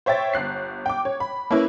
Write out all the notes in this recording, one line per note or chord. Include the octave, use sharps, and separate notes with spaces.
C5 C#5 E5 G5 A6
G1 F#6 C7
G5 D6
C#5
B5
A#3 C#4 E4 B4